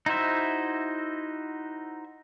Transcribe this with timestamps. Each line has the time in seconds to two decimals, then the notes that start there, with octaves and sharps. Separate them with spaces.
0.06 D#4 E4 F#4 C5 E5